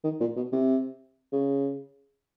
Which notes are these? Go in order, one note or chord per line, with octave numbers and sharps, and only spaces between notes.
D#3
A#2
B2
C3
C#3